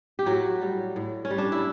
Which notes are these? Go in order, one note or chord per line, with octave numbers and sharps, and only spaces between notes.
G4
A2 F#3 F#4
G3
A2
C#4
G3
D4
E4